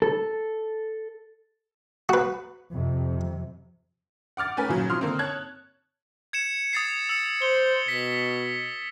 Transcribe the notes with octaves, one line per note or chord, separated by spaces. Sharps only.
A4
F#4 B4
F2 C3
F#5 D6 F6 A6
A3 C#4 A#4 B4 G#5
A#2 C#3 F#3
F3 C4 C6 D#6 F6
D3 A#3 C4
C#5 A5 F#6 G#6
G#6 C#7 E7
D#6 A6 C7
E6 C#7
C5 G7
B2 B6